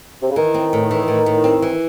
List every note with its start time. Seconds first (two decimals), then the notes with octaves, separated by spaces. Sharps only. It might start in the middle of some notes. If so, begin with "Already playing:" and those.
0.22 C3
0.29 C#3
0.36 D#3 E3
0.54 C4
0.73 A2
0.91 E3
1.08 A2
1.26 A2
1.44 C4
1.62 E3